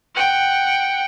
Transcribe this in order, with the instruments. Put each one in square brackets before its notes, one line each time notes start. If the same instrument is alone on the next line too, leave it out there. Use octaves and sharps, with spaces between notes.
[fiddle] F#5 G5